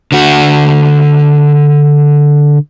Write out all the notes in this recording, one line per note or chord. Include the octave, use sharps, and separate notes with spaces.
D3 F#4